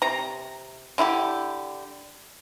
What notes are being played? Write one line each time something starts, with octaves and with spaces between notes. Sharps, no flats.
C3 A#5
D3 E4 F4 G4